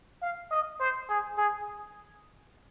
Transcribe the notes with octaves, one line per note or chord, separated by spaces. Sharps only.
F5
D#5
C5
G#4
G#4